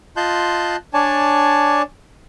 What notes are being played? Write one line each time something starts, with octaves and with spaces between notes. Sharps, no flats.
F4 D#5 A5 C6 F#6 G6
D4 C#5 D5 G#5 A5